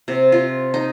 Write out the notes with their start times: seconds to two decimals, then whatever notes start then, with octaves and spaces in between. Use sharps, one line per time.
0.08 C3
0.32 F4
0.74 D#4